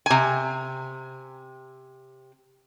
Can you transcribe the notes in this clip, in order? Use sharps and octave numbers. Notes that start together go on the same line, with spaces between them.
C3 G#5